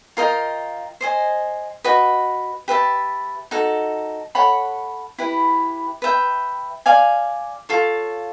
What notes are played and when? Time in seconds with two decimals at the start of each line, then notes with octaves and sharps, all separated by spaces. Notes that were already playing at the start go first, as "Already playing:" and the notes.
0.17 F4 A#4 D#5 G5
1.01 C5 D#5 G#5
1.84 F#4 B4 D#5
2.68 G4 B4 E5 A5
3.51 D#4 F#4 A4
4.35 A4 C#5 F#5 B5
5.18 E4 G4 B4
6.02 B4 E5 G5
6.86 D5 F5 G#5
7.69 F4 A4 C#5